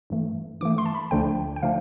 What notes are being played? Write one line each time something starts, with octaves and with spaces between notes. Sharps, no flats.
G2 E3 A3
G2 E3 A3 D6
C6
A5
B5
D2 D3 F3 A3 D4 G5
G5
D3 F3 A3 D4 F5